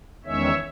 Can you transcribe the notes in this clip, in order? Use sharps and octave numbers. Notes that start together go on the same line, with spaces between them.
E2 D#3 G#3 C#4 C#5 E5